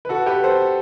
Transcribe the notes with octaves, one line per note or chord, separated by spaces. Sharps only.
B4
F#4 A4
G4 B4
A4 C5